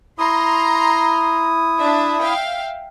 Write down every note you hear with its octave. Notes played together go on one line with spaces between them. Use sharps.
E4 A#5 C6 D#6
D4 E5
E5 F5 G5